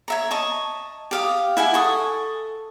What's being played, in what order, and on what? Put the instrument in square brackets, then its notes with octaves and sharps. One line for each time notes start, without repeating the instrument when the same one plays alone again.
[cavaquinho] C#5 E5 A#5
D#5 A5 C#6
G4 F5 D#6
E4 E5 F#5 G#5
A4 C#6 D#6